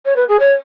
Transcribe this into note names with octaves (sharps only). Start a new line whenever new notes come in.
C#5
B4
G#4
C#5